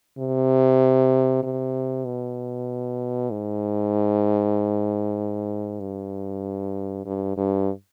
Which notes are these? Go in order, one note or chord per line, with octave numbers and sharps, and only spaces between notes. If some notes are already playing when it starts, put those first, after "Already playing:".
C3
C3
B2
G#2
G2
G2
G2